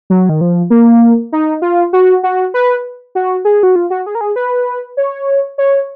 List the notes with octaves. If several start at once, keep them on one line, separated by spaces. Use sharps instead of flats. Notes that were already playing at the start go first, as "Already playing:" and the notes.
F#3
D#3
F3
A#3
D#4
F4
F#4
F#4
B4
F#4
G#4
F#4
F4
F#4
G#4
A#4
G#4
B4
C#5
C#5